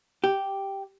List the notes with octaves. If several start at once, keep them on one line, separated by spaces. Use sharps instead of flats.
G4